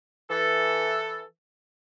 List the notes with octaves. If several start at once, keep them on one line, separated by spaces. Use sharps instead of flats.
E3 A4